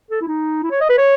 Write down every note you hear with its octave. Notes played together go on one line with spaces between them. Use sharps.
A4
E4
D#4
E4
C#5
D#5
B4
C#5